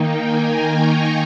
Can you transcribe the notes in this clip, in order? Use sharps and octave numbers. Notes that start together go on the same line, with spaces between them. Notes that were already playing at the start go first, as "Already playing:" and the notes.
Already playing: D#3 A#3 D#4 G5
G#5
A#5
C#6